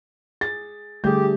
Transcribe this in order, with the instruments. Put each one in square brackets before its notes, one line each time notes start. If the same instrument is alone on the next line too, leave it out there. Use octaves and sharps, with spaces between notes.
[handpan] G#4 [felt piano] A6
[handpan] D3 G3 A3 [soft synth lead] G4 [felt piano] G#4 G6